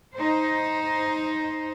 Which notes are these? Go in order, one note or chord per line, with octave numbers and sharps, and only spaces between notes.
D#4 C5